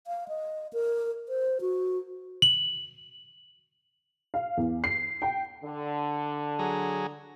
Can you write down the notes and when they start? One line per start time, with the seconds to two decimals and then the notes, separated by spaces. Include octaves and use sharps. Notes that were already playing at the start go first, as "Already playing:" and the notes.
0.07 F5
0.28 D#5
0.73 A#4
1.29 C5
1.61 F#4
2.42 F#7
4.34 F5
4.57 E2
4.84 C7
5.22 G5
5.63 D3
6.59 F#3 G#4 A#5